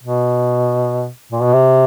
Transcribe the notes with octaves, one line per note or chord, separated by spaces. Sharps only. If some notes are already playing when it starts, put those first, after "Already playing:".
B2
A#2
B2
C3